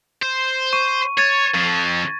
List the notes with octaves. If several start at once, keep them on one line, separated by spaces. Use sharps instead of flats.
C5
C#6 D#7
C#5 G#6 A6 D#7
F2 F3